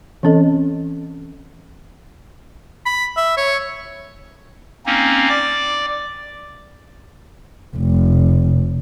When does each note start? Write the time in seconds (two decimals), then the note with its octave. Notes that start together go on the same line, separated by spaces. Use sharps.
0.23 E3 C4 C#4 A4 D#5
2.86 B5
3.16 E5
3.37 C#5
4.86 A#3 C4 C#4 D#4
5.29 D5 D6
7.77 F1